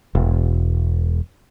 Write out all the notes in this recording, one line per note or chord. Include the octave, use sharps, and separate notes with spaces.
E1